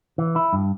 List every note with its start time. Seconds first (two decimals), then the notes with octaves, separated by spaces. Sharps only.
0.18 E3
0.36 E4
0.53 G2